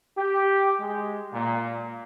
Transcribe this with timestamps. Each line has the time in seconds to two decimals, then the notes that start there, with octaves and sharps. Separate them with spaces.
0.17 G4
0.80 G#3
1.32 A#2